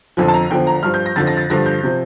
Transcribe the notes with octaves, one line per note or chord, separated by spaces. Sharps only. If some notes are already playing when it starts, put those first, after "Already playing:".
F2 D3 F3
A5
A#5
E2 D3 F3 G5
A#5
G2 F3 F6
G6
A#6
F2 D3 F3 A6
A#6
A6
G2 D3 F3 A#6
G6
C3 F3